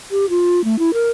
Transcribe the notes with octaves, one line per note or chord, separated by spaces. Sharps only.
G4
F4
A3
E4
A#4